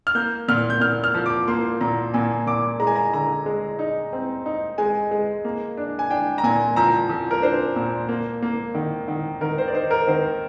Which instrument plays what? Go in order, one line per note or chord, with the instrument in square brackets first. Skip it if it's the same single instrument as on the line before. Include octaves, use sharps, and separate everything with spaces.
[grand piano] F6
A#3 G6
A#2 F6
G6
A#2 F6
F6
F3
D6
A#3 C6
A#2 A#5
A#2 G#5
A#2 D6
G#3 A#5
G#5
A#5
D3 A#5
G#3
D#4
C4
D#4
G#3 G#5
G#3
A#3
D4
G#5
D4 G5
A#5
A#2 G#5
F3 A#5
F3
A#4
D4 C5
A#2
A#3
A#3
D#3
D#3
D#3 A#4
C5
D5
D#4 C5
A#4
D#3 C5